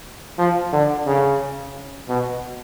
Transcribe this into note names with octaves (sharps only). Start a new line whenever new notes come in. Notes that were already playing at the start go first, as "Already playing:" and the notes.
F3
D3
C#3
B2